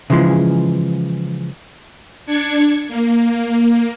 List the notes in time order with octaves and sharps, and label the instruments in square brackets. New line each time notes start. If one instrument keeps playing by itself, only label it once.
[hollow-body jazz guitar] C#3 E3 F3 G#3
[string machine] D4 G#6 C#7
A#3